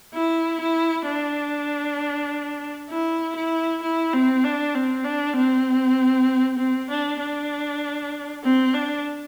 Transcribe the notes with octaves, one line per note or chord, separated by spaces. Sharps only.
E4
E4
D4
E4
E4
E4
C4
D4
C4
D4
C4
C4
D4
D4
C4
D4